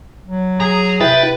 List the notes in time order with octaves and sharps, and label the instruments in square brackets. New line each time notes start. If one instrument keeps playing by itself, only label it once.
[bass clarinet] F#3
[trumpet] G#4 [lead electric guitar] A#5
[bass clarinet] C3 [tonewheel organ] E4 A6 [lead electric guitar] B4 [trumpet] G5